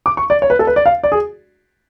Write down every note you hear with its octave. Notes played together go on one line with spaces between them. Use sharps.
D6
C#6
D5
C#5
B4
A4
B4
D5
F5
D5
G#4